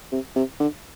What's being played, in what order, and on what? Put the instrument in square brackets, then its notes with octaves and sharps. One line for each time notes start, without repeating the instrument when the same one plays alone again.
[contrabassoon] C3
C3
D3